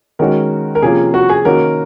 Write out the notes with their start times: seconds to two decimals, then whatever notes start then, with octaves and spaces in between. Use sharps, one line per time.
0.19 D#3 G#3 C#4 F#4 A#4
0.75 A#4
0.82 C3 F3 A#3 C#4 F4 G#4
1.14 F#4
1.30 G#4
1.45 D#3 A#3 C#4 F#4 A#4